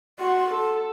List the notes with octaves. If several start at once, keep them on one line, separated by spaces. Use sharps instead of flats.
F#4 C6
A4